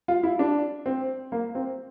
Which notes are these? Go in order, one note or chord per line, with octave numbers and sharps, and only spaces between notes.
F4
E4
D4
C4
A#3
C4